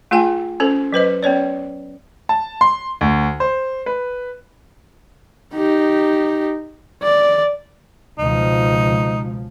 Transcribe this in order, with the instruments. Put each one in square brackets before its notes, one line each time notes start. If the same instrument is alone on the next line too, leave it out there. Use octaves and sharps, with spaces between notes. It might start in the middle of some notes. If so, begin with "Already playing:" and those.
[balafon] A3 F4 G#4 G5 G#5
C#4 A4 C5
F#3 B4 C5 D#5
B3 C#4 C#5 D5
[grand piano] A5
C6
D2
C5
B4
[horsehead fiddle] D#4 G4
D5
[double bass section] C#2 B2 F3 [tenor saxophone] D#4